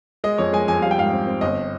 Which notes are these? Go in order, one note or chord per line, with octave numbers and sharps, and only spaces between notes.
G#3 D#5
F2 C#5
G#3 G#5
F2 G#5
G3 F5
G5
G#2 F5
C4
C4
G1 D#5